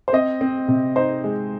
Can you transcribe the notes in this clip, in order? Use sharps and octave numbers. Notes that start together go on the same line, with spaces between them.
C5
C4 D#5
C4
C3
D#4 C5
G#3